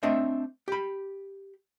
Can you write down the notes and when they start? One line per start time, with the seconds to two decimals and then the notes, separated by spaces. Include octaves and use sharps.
0.03 A3 C4 D4 D#5 E5
0.68 G4 B5